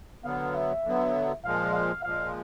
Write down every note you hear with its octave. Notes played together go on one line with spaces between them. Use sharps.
D3 F#3 B3 F5
E5
D3 F#3 B3
A#2 F3 G#3 F5
F5
A#2 F3 G#3 F5